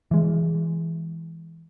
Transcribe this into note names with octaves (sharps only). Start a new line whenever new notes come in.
E3 G#3